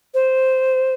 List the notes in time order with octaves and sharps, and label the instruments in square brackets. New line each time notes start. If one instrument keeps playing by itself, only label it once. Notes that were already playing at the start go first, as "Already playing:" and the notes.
[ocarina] C5